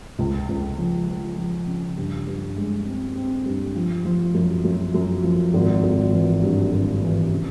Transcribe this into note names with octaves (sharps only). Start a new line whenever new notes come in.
C#2
C#2
F3
F3
F3
C#3
G2
G2
G#3
C4
C4
G2
F3
F3
F#2
F#2
F#2
F3
G#1
G#1
E3
G2
G#1
E3
C#3